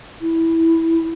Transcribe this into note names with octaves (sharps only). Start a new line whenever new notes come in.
E4